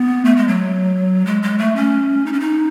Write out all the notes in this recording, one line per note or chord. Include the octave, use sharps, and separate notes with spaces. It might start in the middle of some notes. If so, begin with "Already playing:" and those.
Already playing: B3
A3
G#3
F#3
G#3
G#3
A3
C#4
D#4
C#4
D#4